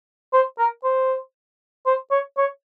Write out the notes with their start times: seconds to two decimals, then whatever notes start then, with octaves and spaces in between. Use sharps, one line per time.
0.33 C5
0.59 A#4
0.84 C5
1.86 C5
2.11 C#5
2.38 C#5